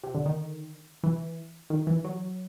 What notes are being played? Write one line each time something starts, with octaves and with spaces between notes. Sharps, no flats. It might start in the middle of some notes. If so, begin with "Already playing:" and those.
C3
D3
D#3
E3
D#3
E3
F#3